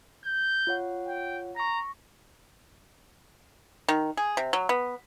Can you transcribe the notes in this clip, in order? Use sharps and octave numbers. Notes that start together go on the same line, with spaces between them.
G6
F4 C#5 F#5
G5
A#5 C#6 A#6
D#3
G#4
C3
F#3
B3